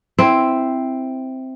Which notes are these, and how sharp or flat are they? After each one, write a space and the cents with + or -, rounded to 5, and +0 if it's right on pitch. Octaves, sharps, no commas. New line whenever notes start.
C4 +0 E4 +0